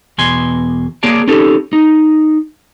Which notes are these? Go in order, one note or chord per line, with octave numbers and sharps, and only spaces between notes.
E2 B2 G#5 C6
A#3 G#4 C#5 D5 A5
C#4 D#4 G4 A4
D#4